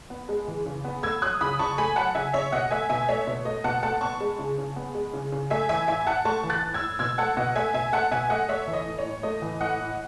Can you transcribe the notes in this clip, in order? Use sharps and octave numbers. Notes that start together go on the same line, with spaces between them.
B3
G#3
E3
C#3
B3
A3 E6 G#6
F#3 D#6 F#6
C#3 B5 D#6
C#3 A5 C#6
A3 G#5 B5
F#3 F#5 A5
C#3 E5 G#5
C#3 C#5 E5
B2 D#5 F#5
A3 E5 G#5
B2 E5 G#5
A3 C#5 E5
B2 C#5
A3 D#5
B2 F#5 A5
A3 F#5 A5
B3 A5 C#6
G#3
C#3
C#3
B3
G#3
C#3
C#3
A3 E5 G#5
E3 E5 G#5
A2 E5 G#5
A2 F#5 A5
A3 A5 C#6
E3
F#6 A6
A2
E6 G#6
A2
B2 E6 G#6
A3 F#5 A5
B2 D#5 F#5
A3 E5 G#5
B2 E5 G#5
A3 F#5 A5
B2 E5 G#5
A3 D#5 F#5
A3 C#5 E5
E3
D#5
A2
C#5
A2
A3 D#5
E3
A2 D#5 F#5
A2